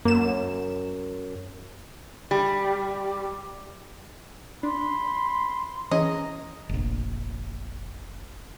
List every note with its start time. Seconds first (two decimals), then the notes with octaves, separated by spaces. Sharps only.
0.05 F#2 A#3 E7
2.31 G3
4.63 D4 B5 C6
5.91 E3 C#4 G#4 D#5 A#5
6.69 F1 A#1